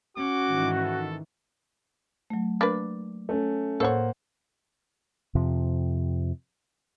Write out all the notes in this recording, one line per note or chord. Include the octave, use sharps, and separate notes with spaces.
C#4 F#4 D6
G#2 D#3 E3
A4
F#3 A3
A#3 D4 B4 A6
A3 C#4
A2 A#3 A4 C5 C#5 F#5
F2 C3 F3